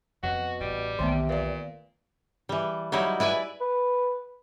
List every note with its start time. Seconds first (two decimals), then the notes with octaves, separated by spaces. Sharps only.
0.23 F2 B2 F#4
0.61 A1 G3 E4
0.99 B1 E2 C3 D#3 A3 B3
1.29 A#2 B4 D5
2.49 E3 G3
2.92 F#3 G3 D#4 E4
3.20 E4 B4 D5 G#5
3.61 B4